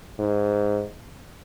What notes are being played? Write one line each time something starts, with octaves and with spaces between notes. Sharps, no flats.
G#2